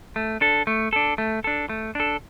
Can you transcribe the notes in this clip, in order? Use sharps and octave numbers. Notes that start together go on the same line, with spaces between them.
A3
D4 A4
A3
D4 A4
A3
D4 A4
A3
D4 A4